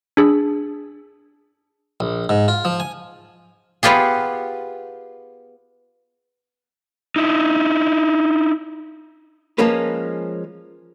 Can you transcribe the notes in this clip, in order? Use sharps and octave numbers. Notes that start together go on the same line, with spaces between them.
D4 G#4 E6
A#1
G#2
F4
F3
G#5
B3 F4 G4 G#4
D#4 E4
F3 G#3 A#3 C#4 B4